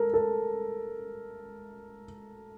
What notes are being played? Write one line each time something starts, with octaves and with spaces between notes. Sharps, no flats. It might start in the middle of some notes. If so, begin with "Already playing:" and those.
Already playing: A4 A#4
A4